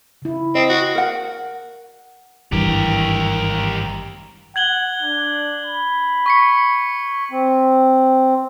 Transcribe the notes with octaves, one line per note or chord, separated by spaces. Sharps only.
C#3 E4
C4 D#5
F#4
A#4 F#5
G#1 G2 E3 G4 A#4
F#5 G#6 F#7 G7
D4
B5
C#6 B6 C#7
C4